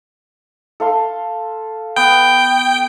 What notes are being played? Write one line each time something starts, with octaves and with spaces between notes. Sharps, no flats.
A4 F5 C6
B3 G5